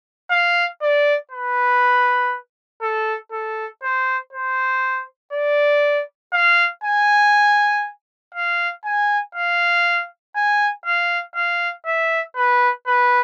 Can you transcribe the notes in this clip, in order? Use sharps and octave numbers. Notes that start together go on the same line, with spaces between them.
F5
D5
B4
A4
A4
C5
C5
D5
F5
G#5
F5
G#5
F5
G#5
F5
F5
E5
B4
B4